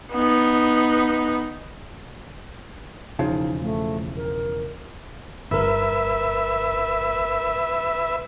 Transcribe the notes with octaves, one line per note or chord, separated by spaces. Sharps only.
B3 D#4
E1 C#3 F3 D#4
A3
A#4
G1 A#4 B4 E5